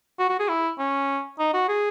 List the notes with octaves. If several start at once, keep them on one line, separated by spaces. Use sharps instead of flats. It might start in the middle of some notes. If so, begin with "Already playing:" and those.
F#4
F#4
G#4
E4
C#4
D#4
F#4
G#4